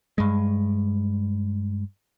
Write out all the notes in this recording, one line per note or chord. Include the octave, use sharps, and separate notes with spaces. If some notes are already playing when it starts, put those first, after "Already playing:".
G2 G#3